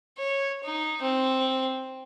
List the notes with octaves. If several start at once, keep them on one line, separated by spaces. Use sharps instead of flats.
C#5
D#4
C4